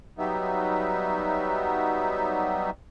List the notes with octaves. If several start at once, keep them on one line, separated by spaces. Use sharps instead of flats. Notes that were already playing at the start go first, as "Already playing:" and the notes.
F#3 G3 B3 D#4 E5